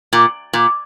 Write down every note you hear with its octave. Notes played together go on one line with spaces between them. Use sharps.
A#2
A#2